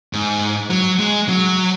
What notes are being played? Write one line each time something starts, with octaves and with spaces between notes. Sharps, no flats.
G#2
F#3
G#3
F#3